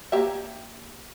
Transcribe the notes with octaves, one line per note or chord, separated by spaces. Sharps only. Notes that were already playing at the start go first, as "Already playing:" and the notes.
A#3 G4 E5